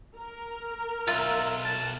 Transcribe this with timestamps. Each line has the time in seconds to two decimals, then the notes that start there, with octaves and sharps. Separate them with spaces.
0.16 A#4
1.07 B1 F4 E5
1.64 A5